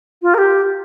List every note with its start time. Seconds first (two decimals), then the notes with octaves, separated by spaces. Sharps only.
0.22 F4
0.34 A#4
0.38 G4